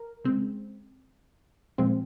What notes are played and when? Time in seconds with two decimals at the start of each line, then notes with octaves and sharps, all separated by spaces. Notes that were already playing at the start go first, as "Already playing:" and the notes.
Already playing: A#4
0.25 C#3 G#3 C4
1.78 A#2 F3 G#3 C4